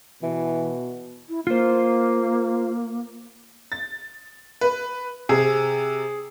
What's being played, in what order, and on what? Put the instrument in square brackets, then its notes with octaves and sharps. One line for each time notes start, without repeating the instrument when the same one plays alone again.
[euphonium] B2 [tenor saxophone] E3
[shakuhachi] E4
[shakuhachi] A#3 [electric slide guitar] F4 C5
[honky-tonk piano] A6
B4
[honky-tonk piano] C3 [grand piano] G#4